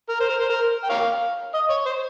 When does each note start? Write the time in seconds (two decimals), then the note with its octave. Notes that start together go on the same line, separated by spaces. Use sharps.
0.09 A#4
0.20 C5
0.29 A#4
0.40 C5
0.49 A#4
0.84 G5
0.90 A#4 C#5 F5
1.54 D#5
1.70 C#5
1.86 C5